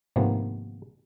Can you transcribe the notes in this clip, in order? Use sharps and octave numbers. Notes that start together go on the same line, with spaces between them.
G#1 C3 D#3 F3 A#3 B3